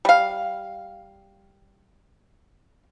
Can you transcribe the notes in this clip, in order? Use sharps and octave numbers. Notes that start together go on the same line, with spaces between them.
G3 F5